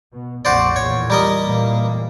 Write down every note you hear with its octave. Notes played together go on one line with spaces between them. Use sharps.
B2
A#1 F2 F#4 C5 D5
E2 A#2 C#5
G3 A#4 D#5
A#2 E3 A#3